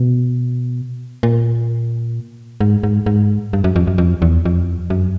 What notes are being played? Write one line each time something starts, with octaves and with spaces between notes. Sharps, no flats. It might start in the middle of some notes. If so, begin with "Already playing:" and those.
Already playing: B2
A#2
G#2
G#2
G#2
G2
F#2
F2
F#2
F2
E2
F2
F#2